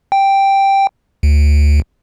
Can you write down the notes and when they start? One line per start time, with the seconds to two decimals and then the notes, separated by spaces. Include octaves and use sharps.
0.12 G5
1.23 D2